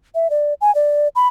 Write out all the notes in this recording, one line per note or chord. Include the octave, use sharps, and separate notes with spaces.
E5
D5
G#5
D5
B5